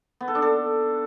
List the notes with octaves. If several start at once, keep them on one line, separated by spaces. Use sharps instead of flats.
B3
A4
D4
A4